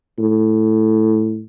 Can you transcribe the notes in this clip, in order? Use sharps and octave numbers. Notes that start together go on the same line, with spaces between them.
A2